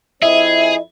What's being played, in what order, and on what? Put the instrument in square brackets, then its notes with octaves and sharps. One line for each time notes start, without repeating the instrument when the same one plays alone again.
[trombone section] F2 C4 E4 [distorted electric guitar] G#4 [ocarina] D#5 [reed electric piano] E5